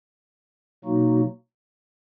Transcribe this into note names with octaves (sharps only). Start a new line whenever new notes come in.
B2 F#3 A#3 D#4 F#4